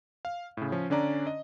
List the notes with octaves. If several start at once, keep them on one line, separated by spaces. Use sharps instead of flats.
F5
A2 C#3
F3 C#4
D3 C#4 D4 D5 A#5
D#5